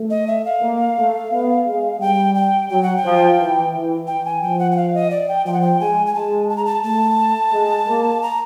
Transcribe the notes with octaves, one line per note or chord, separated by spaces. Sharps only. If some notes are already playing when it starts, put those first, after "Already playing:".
Already playing: A3
D#5
E5
F5
A#3
A3
B3
G#3
G3 G5
G5
F#3 G5
F#5
G5
F3
E3
E3
E3 G5
G#5
F3 G5
F#5
F#5
F5
D#5
D5
G5
F3 G5
F#5
G5
G#3 G#5
G#5
G#3 A5
A5
A#5
A5
A3 A5
G#3
A#3
A#5